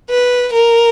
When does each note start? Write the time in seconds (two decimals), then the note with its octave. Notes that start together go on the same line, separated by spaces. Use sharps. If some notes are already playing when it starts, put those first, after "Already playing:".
0.10 B4
0.53 A#4